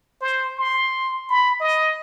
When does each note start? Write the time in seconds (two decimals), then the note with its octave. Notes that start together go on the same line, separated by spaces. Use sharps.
0.21 C5
0.58 C6
1.29 B5
1.60 D#5